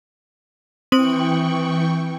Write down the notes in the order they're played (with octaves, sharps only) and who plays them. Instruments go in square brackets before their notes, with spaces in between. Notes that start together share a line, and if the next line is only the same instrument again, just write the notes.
[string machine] E3 G5 C#6 [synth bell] C4 D#6 F#7